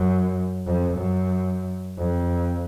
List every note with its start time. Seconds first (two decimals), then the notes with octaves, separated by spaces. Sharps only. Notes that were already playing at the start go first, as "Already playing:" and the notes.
Already playing: F#2
0.66 F2
0.98 F#2
1.98 F2